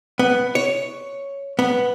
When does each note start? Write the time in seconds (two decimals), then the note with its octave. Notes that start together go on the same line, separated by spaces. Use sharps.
0.19 B3
0.55 C#5
1.59 B3